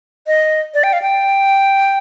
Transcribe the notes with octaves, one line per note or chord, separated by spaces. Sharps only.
D#5
D5
G5
F5
G5